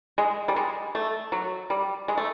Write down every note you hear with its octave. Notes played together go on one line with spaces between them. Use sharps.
G#3
G3
G#3
A3
F#3
G3
G#3
A3